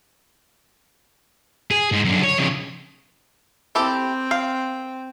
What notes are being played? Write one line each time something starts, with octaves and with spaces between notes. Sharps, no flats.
G#4
G#2
F#2 D3
C#5
F2 C#3
C4 E4 G4 A4 G5
F5